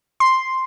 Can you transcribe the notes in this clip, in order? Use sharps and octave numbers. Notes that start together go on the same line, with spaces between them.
C6